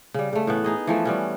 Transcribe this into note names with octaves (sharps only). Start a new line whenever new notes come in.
C#3 G3
C#3 A3
A2 E3 B3
D#4 G#4 D#5
E3 F3 A3
G3 B3 C#4